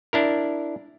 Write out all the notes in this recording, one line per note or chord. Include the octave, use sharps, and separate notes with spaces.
D4 E4 A#4